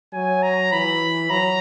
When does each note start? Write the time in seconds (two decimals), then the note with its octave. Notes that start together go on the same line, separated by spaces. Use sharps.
0.13 F#3 G#5
0.43 A#5
0.72 E3 B5
1.30 F#3 A#5